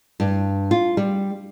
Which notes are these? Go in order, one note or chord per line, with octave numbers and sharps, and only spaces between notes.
G2
F4
G3